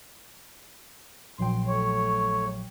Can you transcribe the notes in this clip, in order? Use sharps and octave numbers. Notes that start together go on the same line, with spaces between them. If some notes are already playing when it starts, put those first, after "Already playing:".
A#1 F#3 G5 C6
A3 C#5